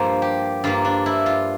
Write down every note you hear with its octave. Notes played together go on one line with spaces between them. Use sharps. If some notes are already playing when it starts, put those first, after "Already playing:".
Already playing: G2 F3 A#3 C5
G4
G2 F3 A#3 F4
D4
E4
F4